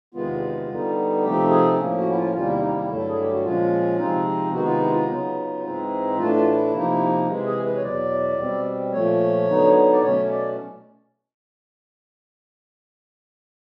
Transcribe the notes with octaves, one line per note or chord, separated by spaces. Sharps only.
E2 C3 D#3 G#3 B3 F4
D3 G3 B3 D#4
C3 F3 A3 C4 D#4 G4
G#4
A2 F3 A#3 C#4
F#4
E4
F4
E2 C3 D#3 G3 A#3 F4
E4
D#4
E4
G2 D3 F#3 A3
A4
G#4
G4
F#4
A#2 F3 G#3 C#4 F4
C3 F3 G#3 C4 D#4
C3 D#3 G#3 B3 D#4 F#4
F4
E4
F4
C#3 F#3 B3 D#4
G#2 E3 G#3 C4 D#4
A2 E3 A3 D4 F4
F4
E4
C3 F3 A#3 D#4
C3 E3 G#3
G#4
B4
C#5
E2 B2 F#3 D5
B2 G3 C4
A#2 F3 A3 C#5
D3 F#3 B3 D#4
D5
B2 F#3 A3 C#4 C#5
D5